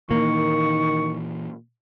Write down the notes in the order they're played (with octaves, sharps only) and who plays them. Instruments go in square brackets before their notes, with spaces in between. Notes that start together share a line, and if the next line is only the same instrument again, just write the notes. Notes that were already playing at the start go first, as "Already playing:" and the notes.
[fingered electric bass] A#2 E3 [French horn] D#3 [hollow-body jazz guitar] A#3 [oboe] C#6